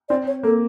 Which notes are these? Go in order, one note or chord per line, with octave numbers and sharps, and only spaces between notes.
C4 D5
C#5
A#3 A4